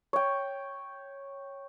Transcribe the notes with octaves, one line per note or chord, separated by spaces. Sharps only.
C#5 G5